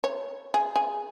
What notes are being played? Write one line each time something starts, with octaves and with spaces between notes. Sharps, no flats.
C#5
G#4
G#4